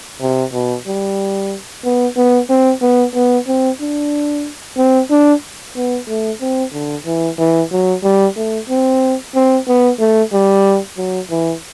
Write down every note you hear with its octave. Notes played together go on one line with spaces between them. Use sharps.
C3
B2
G3
B3
B3
C4
B3
B3
C4
D4
C4
D4
B3
A3
C4
D3
E3
E3
F#3
G3
A3
C4
C4
B3
A3
G3
F#3
E3